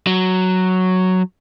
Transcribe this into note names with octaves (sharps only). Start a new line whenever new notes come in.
F#3